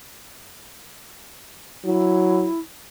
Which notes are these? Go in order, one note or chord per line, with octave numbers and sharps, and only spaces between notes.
F#3 E4